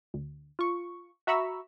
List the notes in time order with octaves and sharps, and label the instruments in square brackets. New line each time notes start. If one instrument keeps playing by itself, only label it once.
[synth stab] D2
F4 C#6
F#4 E5 A#5 B5 C#6 E6